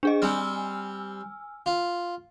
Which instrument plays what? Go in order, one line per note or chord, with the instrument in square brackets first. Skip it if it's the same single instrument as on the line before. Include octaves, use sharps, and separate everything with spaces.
[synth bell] D4 G#4 D#5
[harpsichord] G3 C4 [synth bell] G#5 E6 F6
[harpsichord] F4